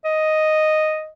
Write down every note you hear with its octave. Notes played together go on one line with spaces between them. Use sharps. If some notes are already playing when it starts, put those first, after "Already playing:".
D#5